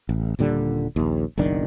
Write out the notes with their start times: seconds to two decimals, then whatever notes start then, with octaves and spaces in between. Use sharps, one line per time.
0.09 A1
0.39 D#1 A#2 D3 G3
0.96 A#1 D#2
1.37 F#1 B1 D#3 D4